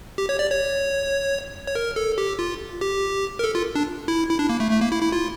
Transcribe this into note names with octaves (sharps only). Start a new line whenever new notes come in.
G4
C#5
D5
C#5
C#5
A#4
A4
G4
F4
G4
A#4
A4
F4
D4
E4
E4
D4
A#3
A3
A3
A#3
E4
E4
F4